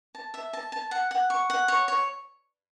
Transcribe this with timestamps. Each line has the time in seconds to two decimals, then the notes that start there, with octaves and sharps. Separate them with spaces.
0.15 A5
0.34 E5
0.53 A5
0.72 A5
0.91 F#5
1.11 F#5
1.30 C#6
1.50 F#5
1.68 C#5
1.88 C#5